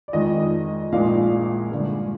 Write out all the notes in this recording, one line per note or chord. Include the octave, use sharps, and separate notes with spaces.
D5
F2 D#3 G#3 D#5
A#1 A#2 F3 G#3 F5
G2 D3 G#3